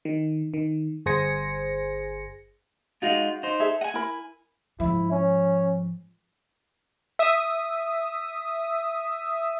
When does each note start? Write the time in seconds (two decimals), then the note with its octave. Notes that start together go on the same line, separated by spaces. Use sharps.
0.05 D#3
0.54 D#3
1.06 G1 G#4 C5 G#5 A#6 C#7
3.02 G#3 D#4 F4 F#4 F5
3.43 D#4 C5
3.60 G#4 A4 E5
3.81 D#5 F#5 G#5
3.94 E4 A#4 B5
4.80 G#2 F3 E4
5.11 C#4
7.19 E5 D#6